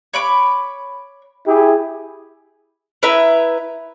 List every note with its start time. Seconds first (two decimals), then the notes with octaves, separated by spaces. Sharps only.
0.14 C#5 B5 D6
1.47 E4 G4 G#4
3.03 E4 B4 E5 A#5